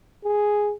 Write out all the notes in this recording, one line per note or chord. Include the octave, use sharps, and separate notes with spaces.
G#4